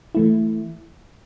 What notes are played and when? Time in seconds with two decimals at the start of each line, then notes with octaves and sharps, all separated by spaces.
0.15 E3 A3 E4